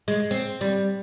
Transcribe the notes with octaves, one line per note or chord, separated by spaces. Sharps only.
G#3
C4
G3